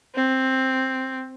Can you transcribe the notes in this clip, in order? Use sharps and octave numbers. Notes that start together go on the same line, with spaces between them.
C4